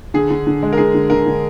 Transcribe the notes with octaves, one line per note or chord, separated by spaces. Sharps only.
D3 G#4
D3
D3
G#3
A#4
D3 G#4
D3
D3 A#4
D3